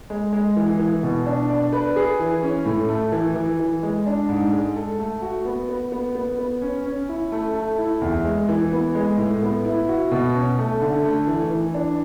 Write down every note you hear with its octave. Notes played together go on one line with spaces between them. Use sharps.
G#3
G#3
E3
E3
B2
D4
D5
B4
G#4
E3
C#4
A2
A3
E3
E3
E3
G#3
D4
G#2
G#3
A4
A3
F#4
B3
B3
B3
B3
B3
C#4
C#4
E4
A3
A3
E4
E2
G#3
E3
B3
G#3
A2
B3
E4
F#4
B2
C#4
A3
D3
A3
E3
E3
D4